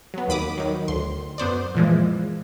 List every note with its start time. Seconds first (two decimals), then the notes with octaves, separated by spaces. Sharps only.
0.14 F#3 B3
0.28 D#2 D#3 B5 D6 D#6
0.58 D#3 F#3
0.88 D2 C6
1.38 F#2 B3 C5 D5
1.75 A#2 E3 F3 G#3